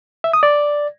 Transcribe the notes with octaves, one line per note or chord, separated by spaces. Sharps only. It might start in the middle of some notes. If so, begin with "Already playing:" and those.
E5
D#6
D5